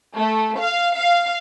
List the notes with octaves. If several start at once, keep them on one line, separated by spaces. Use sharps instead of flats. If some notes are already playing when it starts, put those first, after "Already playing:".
A3
F5
F5